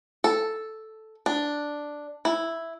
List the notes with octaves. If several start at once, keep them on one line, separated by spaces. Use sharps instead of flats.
A4
D4
E4